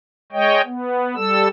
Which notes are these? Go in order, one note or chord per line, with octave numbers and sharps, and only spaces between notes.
G#3 C#5 D#5 G5
B3
G3 A4 E6